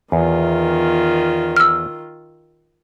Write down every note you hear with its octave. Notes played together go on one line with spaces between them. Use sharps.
E2 D#3 F4
E6 F6